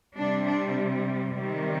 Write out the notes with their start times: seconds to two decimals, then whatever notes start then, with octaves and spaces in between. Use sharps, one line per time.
0.17 C3 G3 D4
0.46 D4
1.35 C3 D#3 G3